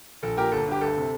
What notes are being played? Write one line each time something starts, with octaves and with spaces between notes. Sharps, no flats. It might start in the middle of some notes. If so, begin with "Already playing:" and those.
A#1 A4
A#2 G4 A#4
G1 A4
G2 G4
D2 A4
C3